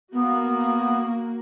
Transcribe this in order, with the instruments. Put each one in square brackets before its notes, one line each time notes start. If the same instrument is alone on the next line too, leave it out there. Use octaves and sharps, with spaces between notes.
[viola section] A#3 F#4 [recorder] B3